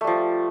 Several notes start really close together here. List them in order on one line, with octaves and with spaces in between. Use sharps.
A3 G3 F3